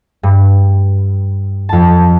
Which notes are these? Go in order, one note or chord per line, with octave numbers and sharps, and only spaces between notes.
G2
F2 A5